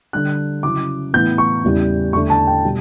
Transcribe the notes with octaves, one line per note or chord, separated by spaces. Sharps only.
D3 G3 D4 F#6
C#3 F#3 C#4 E4 D6
A2 E3 B3 E4 G6
C#6
E2 C#3 G3 C#4 E4
E2 D3 A3 D4 C#6
A5
G5
B2 G3